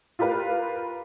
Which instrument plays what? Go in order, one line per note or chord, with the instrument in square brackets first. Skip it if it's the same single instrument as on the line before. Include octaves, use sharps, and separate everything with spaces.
[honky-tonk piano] F4 G4 A#4 B4 F5